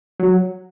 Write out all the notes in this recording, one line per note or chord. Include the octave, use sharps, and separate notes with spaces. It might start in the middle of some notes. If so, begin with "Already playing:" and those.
F#3